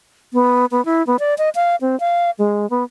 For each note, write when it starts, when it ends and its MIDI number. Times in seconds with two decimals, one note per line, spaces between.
0.33 0.66 59
0.71 0.84 59
0.85 1.05 64
1.07 1.17 59
1.19 1.34 74
1.38 1.49 75
1.55 1.76 77
1.81 1.98 60
2.00 2.30 77
2.39 2.69 56
2.70 2.84 59